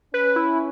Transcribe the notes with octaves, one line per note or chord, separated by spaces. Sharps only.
C#4 B4
E4